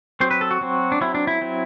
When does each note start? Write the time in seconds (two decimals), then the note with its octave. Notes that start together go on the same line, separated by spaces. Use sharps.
0.20 F#3 C4 C5
0.31 B4
0.41 A4
0.51 F#4
0.61 F#3 C4
0.92 D4
1.01 F#3 C4 E4
1.15 D4
1.27 E4
1.41 F#3 C4